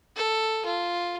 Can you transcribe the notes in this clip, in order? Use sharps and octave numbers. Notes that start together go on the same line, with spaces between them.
A4
F4